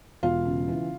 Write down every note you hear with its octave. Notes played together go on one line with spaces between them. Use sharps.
E1 F4 F5
C#3
E3